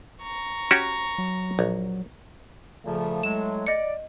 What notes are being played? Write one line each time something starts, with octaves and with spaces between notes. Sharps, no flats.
A#5 C#6
C#4 F#4 G4
F#3
A#1
A#2 C#3 F3 A3
A2 F#3 G#3 E7
D5 D#5 C#7